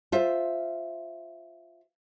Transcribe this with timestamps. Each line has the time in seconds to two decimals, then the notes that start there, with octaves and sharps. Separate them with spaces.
0.12 F4 C5 E5